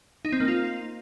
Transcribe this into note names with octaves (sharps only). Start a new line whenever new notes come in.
D#4
C4
A#3
F4